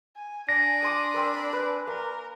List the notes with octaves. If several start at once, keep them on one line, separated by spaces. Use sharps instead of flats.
G#5
D4 G#5 A#6
G#5 C6 D6 D#6
C4 A#4 B5
B4
A#3 A#4